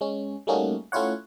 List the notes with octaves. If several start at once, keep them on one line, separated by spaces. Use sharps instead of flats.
G#3 C#4
G3 A3 A#3 C#4 D#4 F#4
A3 C#4 E4 F4 C#5 F#5